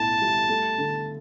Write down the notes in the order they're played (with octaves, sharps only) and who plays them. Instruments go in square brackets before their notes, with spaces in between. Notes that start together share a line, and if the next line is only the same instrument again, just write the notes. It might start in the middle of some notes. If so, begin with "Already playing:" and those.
Already playing: [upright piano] B1 A2 E4 [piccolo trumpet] A5
[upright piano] G3
A3
D3